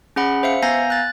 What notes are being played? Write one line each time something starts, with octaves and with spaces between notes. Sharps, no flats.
C#4 G#4 F#5 B5
C5 E5 F5 C#7
B3 F5 G#5 A#5 G6 A#6
F#6 A6